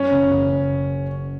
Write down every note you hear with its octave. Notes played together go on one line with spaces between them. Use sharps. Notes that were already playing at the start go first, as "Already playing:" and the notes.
Already playing: F#2 C#4
F#1
F#1